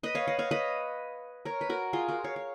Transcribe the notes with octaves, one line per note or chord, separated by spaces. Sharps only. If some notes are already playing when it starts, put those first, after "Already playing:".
B4 D#5
C#5 F5
D#5 F#5
C#5 F5
B4 D#5
A#4 C#5
B4
F#4 A#4
F4 G#4
F#4 A#4
C#5 F5
C#5